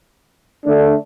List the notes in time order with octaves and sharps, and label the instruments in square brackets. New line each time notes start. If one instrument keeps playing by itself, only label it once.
[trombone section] D3 A3 D4